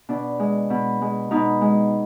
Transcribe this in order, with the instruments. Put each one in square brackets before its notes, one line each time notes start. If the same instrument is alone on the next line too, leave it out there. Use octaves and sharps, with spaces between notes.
[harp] B2 D4
G#3
B2
G#3
B2 D#4
G#3